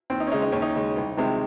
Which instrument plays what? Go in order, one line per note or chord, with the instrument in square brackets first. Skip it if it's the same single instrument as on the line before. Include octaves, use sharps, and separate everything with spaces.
[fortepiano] D#2 C4
D#4
C#4
C#3 G#3 D#4
D#4
D#2 C#4
D#4
C#3 G#3
C2
C3 D#3 G#3